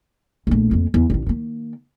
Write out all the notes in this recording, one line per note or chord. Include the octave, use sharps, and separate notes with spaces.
A#1 A2
F2 A#3
E2
A1 D#3
D#3 A#3